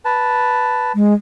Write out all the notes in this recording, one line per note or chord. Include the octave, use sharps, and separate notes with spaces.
B4 A5
G#3